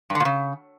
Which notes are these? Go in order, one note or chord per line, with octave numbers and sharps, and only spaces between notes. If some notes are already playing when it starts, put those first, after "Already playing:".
G2
D3
A#2
C#3